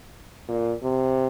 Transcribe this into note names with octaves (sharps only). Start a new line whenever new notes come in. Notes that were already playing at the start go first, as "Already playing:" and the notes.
A#2
C3